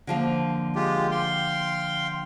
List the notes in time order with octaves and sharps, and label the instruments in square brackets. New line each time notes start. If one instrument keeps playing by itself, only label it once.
[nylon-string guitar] D3 F3 A#3
[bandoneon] G#3 F4 G4
F5 G5 C6